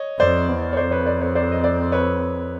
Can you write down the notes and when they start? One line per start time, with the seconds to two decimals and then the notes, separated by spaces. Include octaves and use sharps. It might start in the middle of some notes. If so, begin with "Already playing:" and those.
Already playing: C#5 D#5
0.19 F2 C5 D5
0.48 E2
0.73 C#5
0.77 F2 C5 D5
0.91 B4 C#5
1.06 C5 D5
1.21 B4 C#5
1.35 C5 D5
1.52 D#5
1.64 C5 D5
1.92 B4 C#5